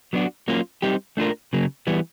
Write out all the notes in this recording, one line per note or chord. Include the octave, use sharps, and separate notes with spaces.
F#3 B3 D4 F#4
F#3 A#3 C#4 F4
G3 C4 D#4 G4
A3 D4 F4 A#4
C#3 F#3 A#3
E3 G3 B3